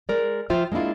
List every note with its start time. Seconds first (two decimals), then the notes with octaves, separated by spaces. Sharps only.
0.09 G#3 A#4 D5
0.50 F3 F4 C5 E5 G5
0.72 G#3 A#3 D4 E4 F4